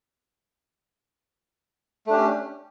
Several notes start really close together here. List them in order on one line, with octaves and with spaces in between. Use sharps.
A3 D4 G4 C#4